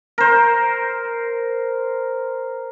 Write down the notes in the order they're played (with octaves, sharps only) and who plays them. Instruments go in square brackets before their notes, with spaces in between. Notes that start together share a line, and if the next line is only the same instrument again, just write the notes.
[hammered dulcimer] A#4 C5